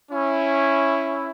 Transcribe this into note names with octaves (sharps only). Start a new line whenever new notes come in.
C#4 E4